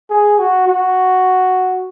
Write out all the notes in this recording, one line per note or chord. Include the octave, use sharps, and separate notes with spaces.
G#4
F#4
F#4